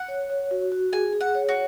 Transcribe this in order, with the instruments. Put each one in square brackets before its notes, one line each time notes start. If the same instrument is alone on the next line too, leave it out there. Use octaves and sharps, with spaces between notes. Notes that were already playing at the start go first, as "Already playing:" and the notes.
Already playing: [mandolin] F#5
[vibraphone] C#5
C#5
F#4
F#4
[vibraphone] G#4 [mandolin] G#5
[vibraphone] G#4
[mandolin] F#5
[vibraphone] C#5
[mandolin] F#4